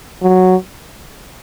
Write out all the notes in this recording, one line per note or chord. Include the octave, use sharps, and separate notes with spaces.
F#3